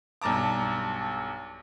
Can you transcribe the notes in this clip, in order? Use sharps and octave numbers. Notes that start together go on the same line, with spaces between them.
B1 G2 A5 A#5 D6